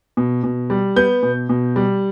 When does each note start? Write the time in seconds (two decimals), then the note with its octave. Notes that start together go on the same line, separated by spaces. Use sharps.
0.17 B2
0.44 B2
0.70 G3
0.96 B3 G6
1.23 B2
1.49 B2
1.76 G3